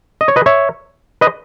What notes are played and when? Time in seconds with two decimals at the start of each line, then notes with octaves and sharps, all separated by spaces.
0.21 D#5
0.28 C#5
0.36 B4 D#5
0.46 C#5 E5
1.21 B4 D#5